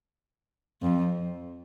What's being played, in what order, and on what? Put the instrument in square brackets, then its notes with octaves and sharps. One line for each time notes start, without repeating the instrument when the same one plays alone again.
[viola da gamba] F2